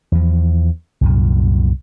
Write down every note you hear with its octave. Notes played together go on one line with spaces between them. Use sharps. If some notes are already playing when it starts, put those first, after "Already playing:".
E2 F3
C2 F#2 A#2